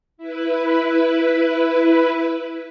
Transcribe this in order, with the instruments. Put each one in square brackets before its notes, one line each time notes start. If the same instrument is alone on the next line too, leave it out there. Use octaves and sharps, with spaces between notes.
[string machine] E4 B4